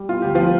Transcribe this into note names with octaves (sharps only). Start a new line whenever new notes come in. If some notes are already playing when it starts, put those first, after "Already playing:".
Already playing: G3
B3 F4
D2 G4
F3 B3 F4